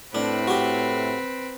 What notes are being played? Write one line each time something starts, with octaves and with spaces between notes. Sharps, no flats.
A2 C4 D4 B4
F#4 G4